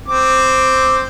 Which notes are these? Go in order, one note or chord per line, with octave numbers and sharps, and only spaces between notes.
C4 D6